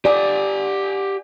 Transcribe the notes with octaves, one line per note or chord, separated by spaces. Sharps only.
G4 D5 G#5